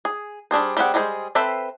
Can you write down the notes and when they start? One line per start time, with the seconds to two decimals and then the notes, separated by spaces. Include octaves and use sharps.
0.05 G#4
0.51 G3 D4 G#4 C5
0.77 G3 C4 G4 G#4 F#5
0.94 G3 G#3 G#4 B4 C5
1.35 C4 A4 B4 C5 E5